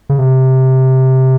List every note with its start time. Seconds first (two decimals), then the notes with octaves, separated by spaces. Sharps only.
0.09 C#3
0.19 C3